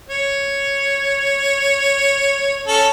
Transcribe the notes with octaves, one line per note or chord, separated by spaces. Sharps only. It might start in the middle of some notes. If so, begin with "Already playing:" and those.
C#5
C#4 A4